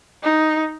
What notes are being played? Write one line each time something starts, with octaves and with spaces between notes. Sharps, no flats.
D#4